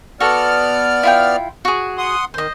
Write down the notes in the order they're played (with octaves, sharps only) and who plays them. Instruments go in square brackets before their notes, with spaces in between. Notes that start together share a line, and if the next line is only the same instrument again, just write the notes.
[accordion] B3 D5 F6 [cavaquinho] F#4 A4
[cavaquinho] E4 F4 G5
F#4 G#4
[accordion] F#5 C6 D#6
[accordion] D#3 [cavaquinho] C5 D#5